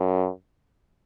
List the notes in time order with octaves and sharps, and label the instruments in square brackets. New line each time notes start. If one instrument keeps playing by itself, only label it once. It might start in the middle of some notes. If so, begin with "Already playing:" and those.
Already playing: [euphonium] F#2